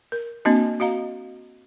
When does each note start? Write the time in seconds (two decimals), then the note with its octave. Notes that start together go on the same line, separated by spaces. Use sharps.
0.12 A#4
0.45 A#3 C4 D4 F#4 D#5
0.80 F#4 D#5 F5 A#5